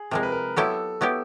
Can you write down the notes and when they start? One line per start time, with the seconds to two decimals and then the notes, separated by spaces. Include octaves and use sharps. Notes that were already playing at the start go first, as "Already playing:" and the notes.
Already playing: G#4
0.11 C3 F3 G#3 A#4
0.23 B4
0.32 A#4
0.57 F#3 B3 E4 G4 A4
1.01 F#3 B3 E4 G4